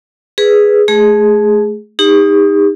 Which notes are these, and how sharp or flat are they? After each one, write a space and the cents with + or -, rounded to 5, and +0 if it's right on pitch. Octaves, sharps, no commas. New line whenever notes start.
G#4 +0 B4 +0
A3 -25 G#4 +0
D#4 +0 G4 +40